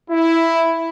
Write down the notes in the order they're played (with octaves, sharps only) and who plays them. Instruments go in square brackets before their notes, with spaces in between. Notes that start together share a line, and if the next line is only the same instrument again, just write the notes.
[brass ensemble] E4